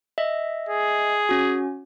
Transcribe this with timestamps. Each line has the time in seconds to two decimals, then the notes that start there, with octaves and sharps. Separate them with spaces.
0.18 D#5 E5
0.69 G#4
1.29 C#4 F#4